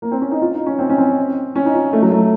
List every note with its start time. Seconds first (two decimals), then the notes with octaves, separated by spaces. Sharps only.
0.02 A#3
0.12 C4
0.21 C#4
0.31 D#4
0.42 F4
0.55 D#4
0.66 C#4
0.79 C4
0.90 C#4
0.98 C4
1.56 C#4
1.66 D#4
1.74 F4
1.93 A3
2.02 F#3
2.11 A3